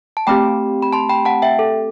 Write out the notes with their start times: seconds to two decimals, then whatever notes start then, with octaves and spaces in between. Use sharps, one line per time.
0.17 A5
0.27 A3 C4 G4 G5 B5
0.82 B5
0.93 A5 C6
1.09 G5 B5
1.25 F#5 A5
1.42 E5 G5
1.59 A4